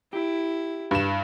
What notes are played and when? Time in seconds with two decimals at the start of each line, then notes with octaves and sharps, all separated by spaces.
0.13 E4 G4
0.91 G2 E7